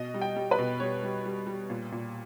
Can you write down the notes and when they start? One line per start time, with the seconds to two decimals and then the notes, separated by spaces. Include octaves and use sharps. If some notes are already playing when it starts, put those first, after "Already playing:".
Already playing: B2 D#5
0.14 G3
0.22 G5
0.36 G3
0.51 B4
0.58 B2
0.80 G3 C#5
1.03 G3
1.25 G3
1.47 G3
1.70 A#2
1.92 A#2